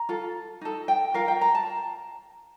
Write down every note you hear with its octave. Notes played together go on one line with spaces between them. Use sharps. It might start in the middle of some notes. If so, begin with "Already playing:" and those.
Already playing: A#5
F4 A4
D#4 A4
G5
F4 A#4 F5
G5
A#5
A5